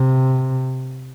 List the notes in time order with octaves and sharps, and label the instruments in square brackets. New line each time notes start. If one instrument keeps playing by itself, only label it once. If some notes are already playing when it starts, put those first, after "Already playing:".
Already playing: [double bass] C3